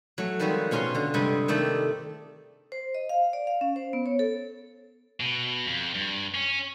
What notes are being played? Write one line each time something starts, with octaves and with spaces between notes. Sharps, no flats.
F#3 A3
D#3 F3 G3 G#3 C4 F#4
B2 C#4 F4 A#5 C6
D3 A#5
G2 C3 G3 G#3 D#5
D#3 A3 D#4 D5
C5
D#5
F5
D5
F5
C#4
C5
B3
C#5
A4
B2
F2
G2
C#4